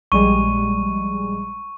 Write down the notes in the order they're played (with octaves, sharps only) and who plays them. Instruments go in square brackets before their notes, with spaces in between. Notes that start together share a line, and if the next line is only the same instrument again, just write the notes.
[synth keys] A#1 G3 G#3 [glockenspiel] C#6 D#7